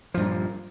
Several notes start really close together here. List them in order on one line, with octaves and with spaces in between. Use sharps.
F3 G2 A#2